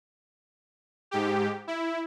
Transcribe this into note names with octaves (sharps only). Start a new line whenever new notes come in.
G#2 G4
E4